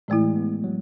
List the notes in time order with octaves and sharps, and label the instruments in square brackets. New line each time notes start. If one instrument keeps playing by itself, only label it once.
[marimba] A2 E3 A3 E4 [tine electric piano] G#3
[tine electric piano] B3
F#3